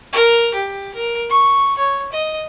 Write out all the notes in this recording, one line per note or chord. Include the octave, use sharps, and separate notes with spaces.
A#4
G4
A#4
C#6
C#5
D#5